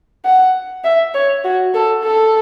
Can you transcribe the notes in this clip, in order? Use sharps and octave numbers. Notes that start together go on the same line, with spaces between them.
F#5
E5
C#5
F#4
A4
A4